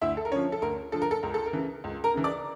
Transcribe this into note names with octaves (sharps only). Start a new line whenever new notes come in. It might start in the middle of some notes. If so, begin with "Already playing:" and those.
D2 E4 E5
A4
A#4
D3 F3 C#4 C#5
A4
D2 A#4
D3 F3 A4
A#4
A4
C#2 A#4
A4
A#4
C#3 E3
C#2
A#4 A#5
C#3 E3
D5 D6